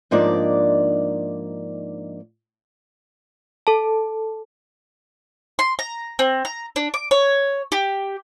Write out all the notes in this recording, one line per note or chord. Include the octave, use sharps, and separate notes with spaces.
G#2 F3 A#3 D4 D#4 D5
A4 A5
C6
A#5
C4
A#5
D4
D6
C#5
G4